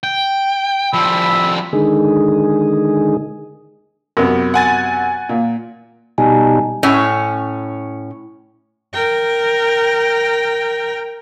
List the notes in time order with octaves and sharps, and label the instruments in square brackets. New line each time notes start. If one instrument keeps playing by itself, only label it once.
[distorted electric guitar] G5
[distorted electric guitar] F3 G3 [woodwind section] B5 E6
[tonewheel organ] D3 D#3 G#3 G#4
[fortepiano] F#2 C3 B3
[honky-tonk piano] F#5 G#5 A6
[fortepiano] A#2
[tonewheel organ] B2 G3 D#4 [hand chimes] G#5 A5
[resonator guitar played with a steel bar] A2 C#4
[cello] A#4 G5